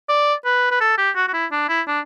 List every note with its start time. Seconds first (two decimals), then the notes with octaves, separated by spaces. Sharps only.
0.09 D5
0.45 B4
0.71 B4
0.80 A4
0.98 G4
1.15 F#4
1.28 F#4
1.33 E4
1.52 D4
1.69 E4
1.87 D4